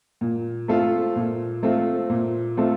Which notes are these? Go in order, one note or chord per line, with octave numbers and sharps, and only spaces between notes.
A#2
A3 C4 F4 A4
A#2
A3 C4 F4 A4
A#2
A3 C4 F4 A4